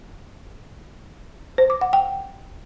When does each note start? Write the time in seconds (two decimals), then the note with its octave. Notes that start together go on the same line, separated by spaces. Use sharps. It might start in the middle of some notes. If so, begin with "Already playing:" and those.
1.58 C5
1.70 D6
1.81 F#5
1.93 G5